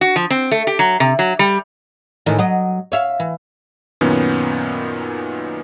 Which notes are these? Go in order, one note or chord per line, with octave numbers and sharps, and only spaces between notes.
F#4
F3
C4
A3
G4
F#3
C3
F#3
G3
A2 D#3 E3
F#3 D#5
C#5 E5 F5
E3
F#2 A#2 D#3 B3 C#4